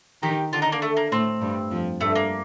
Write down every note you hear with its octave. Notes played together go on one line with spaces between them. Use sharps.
D#3 D#4 G4
D3 D4 F4
D#4
A#3
A3
A#3
A2 A3 C4
G2 G3
F2 F3
G2 A3
A#3